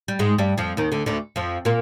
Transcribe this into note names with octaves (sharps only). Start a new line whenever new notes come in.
G3
G#2 G#3
G2 G3
F2 F3
D#2 D#3
D2 D3
D2 D3
F2 F3
A#2 A#3